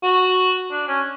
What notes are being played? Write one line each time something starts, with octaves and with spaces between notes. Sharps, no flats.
F#4
D4
C#4